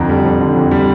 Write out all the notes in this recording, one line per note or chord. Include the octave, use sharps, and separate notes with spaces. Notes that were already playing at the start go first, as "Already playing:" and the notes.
Already playing: F2 D3 A#5
G3
F2
D3
F2
G3